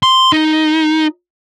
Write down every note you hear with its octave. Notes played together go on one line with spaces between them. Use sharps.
C6
D#4